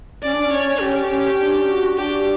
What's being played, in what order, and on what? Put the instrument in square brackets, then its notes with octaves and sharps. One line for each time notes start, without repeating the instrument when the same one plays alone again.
[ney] C#4 [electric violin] D5
[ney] D4
C#4
[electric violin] C#5
[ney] C#4 [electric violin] G4
[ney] C#4
D4
F#4
[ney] D4 [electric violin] G4